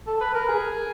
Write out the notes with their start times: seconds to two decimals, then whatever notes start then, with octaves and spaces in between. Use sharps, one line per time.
0.07 A4
0.20 B4
0.34 A#4
0.48 G#4